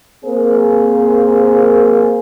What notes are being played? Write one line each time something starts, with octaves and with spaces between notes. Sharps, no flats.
A#3 C4 G#4 A#4 C5